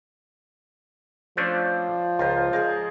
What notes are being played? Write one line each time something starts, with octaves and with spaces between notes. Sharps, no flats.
F3 A3 C#4 D4 C5 D5
C#2 F4 A#4 C5
G#3 G#4 A#4 D#5